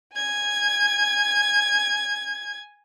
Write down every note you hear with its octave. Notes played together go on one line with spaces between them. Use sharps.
G#5 G#6